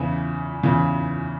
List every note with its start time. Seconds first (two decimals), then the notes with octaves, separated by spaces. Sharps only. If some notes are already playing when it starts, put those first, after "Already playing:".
Already playing: E2 C#3 E3
0.63 E2 C#3 E3